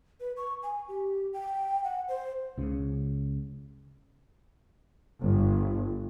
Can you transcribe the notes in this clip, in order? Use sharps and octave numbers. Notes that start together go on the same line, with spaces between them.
B4
C#6
G#5
G4
G5
F#5
C5
C#2 C#3
G1